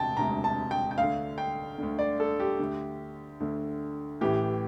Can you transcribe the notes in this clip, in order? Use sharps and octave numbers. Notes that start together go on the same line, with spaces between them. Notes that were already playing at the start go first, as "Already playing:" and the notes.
Already playing: E1 D2 C3 G5 A5
E1 D2 C3 A#5
A5
G5
G5
D2 D3 F5
G5
D2 D3
D5
A4
G4
D2 D3
D2 D3
A1 A2 E3 G4